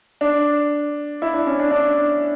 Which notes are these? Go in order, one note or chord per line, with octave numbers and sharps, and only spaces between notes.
D4
E4
D4
C#4
D4
D4